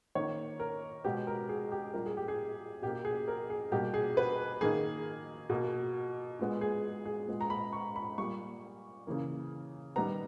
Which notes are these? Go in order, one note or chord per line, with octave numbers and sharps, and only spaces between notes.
D#3 A#3 C#5
A#4
B2 G#3 B3 G4
A#4
G#4
G4
A#2 G3 A#3 A#4
G#4
G4
G#4
B2 A#3 G4
G#4
A#4
G#4
B2 G3 A#3 G4
G#4
B4
D#3 A#3 G#4
B2 A#3
A#2 G#3 B3
G#4
G#4
A#2 G#3 B3
A#5
B5
C#6
B5
A#2 G3 A#3 C#6
C#3 E3 A#3
D#3 G3 B3 A#5